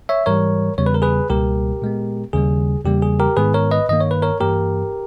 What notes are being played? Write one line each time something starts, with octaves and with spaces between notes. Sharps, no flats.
C#5 E5
G#2 E3 G3 A#4 C#5
E2 C#3 G3 B3 C#5
B4
A#4
G#4 B4
C#2 B2 G3 A#3 G4 A#4
A#2 G#3 B3
D#2 C#3 G3 A#3 G#4
E2 C#3 G3 A#3 G4
G#4
G4 A#4
G#2 D#3 G#3 B3 G#4 B4
A#4 C#5
B4 D#5
G2 D#3 A#3 D#5
C#5
B4
A#4 C#5
G2 E3 A#3 G4 A#4